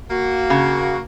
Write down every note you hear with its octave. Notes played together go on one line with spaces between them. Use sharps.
A#3 F#4
C#3